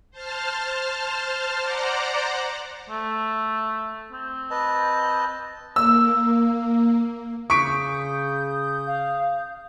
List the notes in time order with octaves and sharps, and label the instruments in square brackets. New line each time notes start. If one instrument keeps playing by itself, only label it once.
[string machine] C5 A5 F6
C5 D5 F#5 A#5 D6
[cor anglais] A3
C4
[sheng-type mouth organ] B4 D#5 A5
[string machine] A#3 [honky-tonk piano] E6
[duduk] C#3 [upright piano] C#6 B6 D7 [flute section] D#6 G6
[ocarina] F5